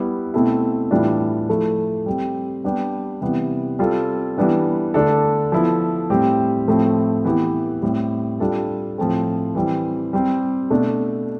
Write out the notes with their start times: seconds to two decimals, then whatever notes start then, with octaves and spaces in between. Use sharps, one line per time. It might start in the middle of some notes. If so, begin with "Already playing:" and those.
Already playing: G3 B3 E4 G4
0.34 B2 A3 C4 E4 A4
0.91 A2 E3 G3 D4 F4
1.49 F3 A3 E4 A4
2.06 G3 C4 G4
2.64 G3 B3 D4 G4
3.21 C3 E3 G3 B3
3.79 G3 C4 F4 A4
4.38 E3 G3 B3 D4
4.94 D3 A3 D4 A4
5.52 F3 B3 E4 A4
6.10 A2 G3 C4 G4
6.68 A2 F3 A3 C4 E4
7.25 E3 B3 E4 G4
7.82 A2 G3 C4 G4
8.40 G3 D4 F4 A4
8.98 A2 F3 A3 C4
9.55 E3 G3 C4
10.13 G3 C4 G4
10.70 B2 A3 D4